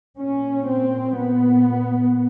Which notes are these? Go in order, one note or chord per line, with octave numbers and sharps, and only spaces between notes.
A#2 C#4
C4
A#2 B3